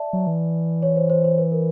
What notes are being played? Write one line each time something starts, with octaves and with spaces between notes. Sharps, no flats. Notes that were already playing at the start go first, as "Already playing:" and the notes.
Already playing: D5 E5 A5
F#3
E3
C#5
C5
C5
C5
B4
A#4